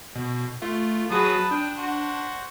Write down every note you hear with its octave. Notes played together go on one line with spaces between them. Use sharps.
B2
A3 F4
F#3 F#4 G#4 B4 A5 D#6
D4 G5
F#4 C5